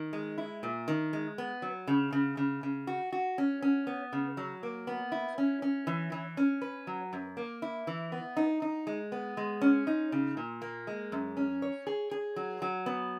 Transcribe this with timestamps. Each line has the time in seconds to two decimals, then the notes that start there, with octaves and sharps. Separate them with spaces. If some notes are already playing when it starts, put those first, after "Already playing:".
Already playing: D#3
0.13 G#3
0.38 E4
0.63 A#2
0.88 D#3
1.13 G#3
1.38 B3
1.62 F#3
1.87 C#3
2.12 C#3
2.37 C#3
2.63 C#3
2.87 F#4
3.12 F#4
3.38 C#4
3.62 C#4
3.87 B3
4.13 C#3
4.37 F#3
4.63 A#3
4.87 B3
5.12 E4
5.38 C#4
5.62 C#4
5.87 E3
6.12 E3
6.37 C#4
6.62 B4
6.87 F#3
7.13 F#2
7.37 A#3
7.62 E4
7.87 E3
8.12 B3
8.37 D#4
8.62 D#4
8.87 G#3
9.12 B3
9.37 G#3
9.62 C#4
9.87 D#4
10.12 C#3
10.37 A#2
10.62 A#3
10.87 G#3
11.12 F#2
11.37 C#4
11.62 C#5
11.87 G#4
12.11 G#4
12.36 F#3
12.62 F#3
12.86 B3